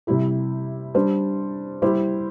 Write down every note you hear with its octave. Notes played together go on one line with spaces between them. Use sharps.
C3 G3 E4 G4
G3 D4 C5
G3 E4 G4 C5